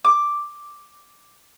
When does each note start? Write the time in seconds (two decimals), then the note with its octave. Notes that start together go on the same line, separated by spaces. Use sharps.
0.05 D6